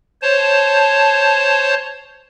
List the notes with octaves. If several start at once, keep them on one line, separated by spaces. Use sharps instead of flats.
C5 C#5 A5